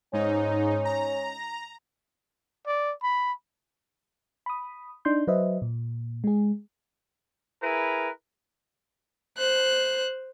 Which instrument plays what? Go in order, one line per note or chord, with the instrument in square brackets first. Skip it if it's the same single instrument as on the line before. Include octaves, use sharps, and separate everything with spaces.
[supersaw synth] G#2 D#4 [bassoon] C#4
[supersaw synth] A#5
[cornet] D5
B5
[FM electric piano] B5 D#6
D4 D#4 C6 G6
F#3 B4 C5 D#5 E5
A#2
G#3 G#4
[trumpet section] E4 G#4 A#4 B4
[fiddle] C5 F#6